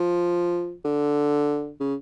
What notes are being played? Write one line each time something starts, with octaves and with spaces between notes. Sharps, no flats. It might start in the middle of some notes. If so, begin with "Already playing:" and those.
Already playing: F3
D3
C#3